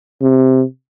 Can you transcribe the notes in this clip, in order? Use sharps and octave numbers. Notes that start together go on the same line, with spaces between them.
C3